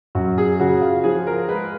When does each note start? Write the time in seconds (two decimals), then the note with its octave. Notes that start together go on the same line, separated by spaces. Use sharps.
0.15 F#2 F#4
0.38 G#4
0.60 C#3 F#4
0.81 F4
1.04 F3 G#4
1.27 A#4
1.48 G#3 B4